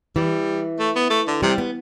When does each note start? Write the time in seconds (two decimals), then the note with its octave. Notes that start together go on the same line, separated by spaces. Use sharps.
0.16 E3 G3
0.79 A3
0.96 B3
1.10 A3
1.27 D3
1.42 C3 G3
1.58 B3